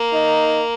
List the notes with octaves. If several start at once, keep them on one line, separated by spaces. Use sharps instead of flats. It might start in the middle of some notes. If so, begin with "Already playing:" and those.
Already playing: A#3
D#4